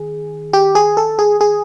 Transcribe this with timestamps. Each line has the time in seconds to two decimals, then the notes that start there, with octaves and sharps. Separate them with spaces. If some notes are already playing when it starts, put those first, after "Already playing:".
Already playing: D#3 G#4
0.53 G4
0.75 G#4
0.97 A4
1.19 G#4
1.41 G#4